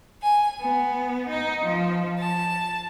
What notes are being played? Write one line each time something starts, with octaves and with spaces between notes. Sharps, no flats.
G#5
B3
D#4
F3
A5